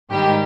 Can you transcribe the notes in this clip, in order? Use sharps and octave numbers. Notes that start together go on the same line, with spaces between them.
G#2 D#3 G3 G4